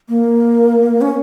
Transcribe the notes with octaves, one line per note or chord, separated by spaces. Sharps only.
A#3
C#4